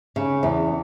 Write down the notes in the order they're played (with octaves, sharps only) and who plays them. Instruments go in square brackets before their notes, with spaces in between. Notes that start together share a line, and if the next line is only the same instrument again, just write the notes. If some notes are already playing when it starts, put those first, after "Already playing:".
[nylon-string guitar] C#3
E2